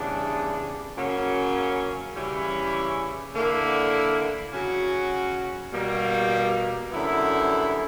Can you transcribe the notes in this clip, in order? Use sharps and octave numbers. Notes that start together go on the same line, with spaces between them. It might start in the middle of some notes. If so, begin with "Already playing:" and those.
Already playing: C#3 E3 G3 B3 D4
C#3 F#3 A#3 C#4
C#3 E3 G3 C#4 E4
D3 A#3 E4
C#3 F#3 C#4 F#4
B2 G3 A#3
F#2 D3 G3 B3 E4